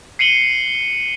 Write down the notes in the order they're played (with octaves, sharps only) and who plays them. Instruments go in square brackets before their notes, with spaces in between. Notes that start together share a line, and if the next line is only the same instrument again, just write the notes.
[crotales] C7 C#7 D#7 F#7 G7